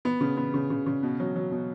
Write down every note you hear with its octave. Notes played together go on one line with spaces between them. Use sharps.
B3
C#3
B3
C#3
C#3
C#3
B2
F#3
F#3
B2